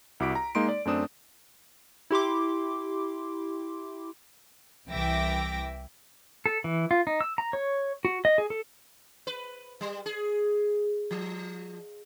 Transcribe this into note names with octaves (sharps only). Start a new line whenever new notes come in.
C2 E4 F#4 D6 B6 D7
A#5
G#3 A#3 D#4 C6 D7
D5
F#2 A3 C4 D4 D#6 E7
E4 G4 C6 D6
C2 E3 E5 G5 D6 A#6
A4
E3
F4
D#4
E6
A#5
C#5
F#4
D#5
G#4
A4
B4
G3
G#4
F3